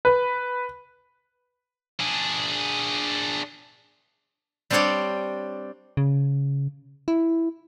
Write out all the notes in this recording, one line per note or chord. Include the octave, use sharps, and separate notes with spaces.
B4
D4 G#4
G3 C4 D4 G4 C#5 D5
C#3
E4